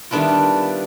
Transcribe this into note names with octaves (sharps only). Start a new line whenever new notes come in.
D#3 G3 B3 D4 E4 F4